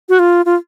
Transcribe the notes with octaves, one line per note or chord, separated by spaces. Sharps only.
F#4
F4
F4